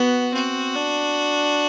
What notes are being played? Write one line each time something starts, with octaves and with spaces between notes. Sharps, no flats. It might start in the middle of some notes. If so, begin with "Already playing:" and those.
Already playing: B3 F#4
C4 F#4
D4